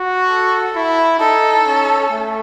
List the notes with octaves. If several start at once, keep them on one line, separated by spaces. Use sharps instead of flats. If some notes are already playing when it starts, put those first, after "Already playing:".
Already playing: F#4
A4
E4
D#4 A4
C#4
A3